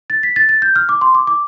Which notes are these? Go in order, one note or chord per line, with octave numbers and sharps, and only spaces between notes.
A6
B6
A6
A6
G6
F6
D6
C6
D6
D6